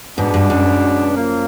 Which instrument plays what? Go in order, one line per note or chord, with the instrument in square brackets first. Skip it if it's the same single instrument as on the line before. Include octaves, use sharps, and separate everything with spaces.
[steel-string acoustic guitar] G#2 [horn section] B2 G#3 B3 D4
[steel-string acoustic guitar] G2
F#2
[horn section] F3 A#3